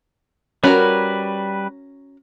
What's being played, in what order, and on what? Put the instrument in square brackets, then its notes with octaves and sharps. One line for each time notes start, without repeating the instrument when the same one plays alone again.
[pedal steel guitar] G3 B4 [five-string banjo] C#4 F#4 A#4